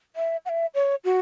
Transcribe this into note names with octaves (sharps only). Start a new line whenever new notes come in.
E5
F#5
E5
C#5
F#4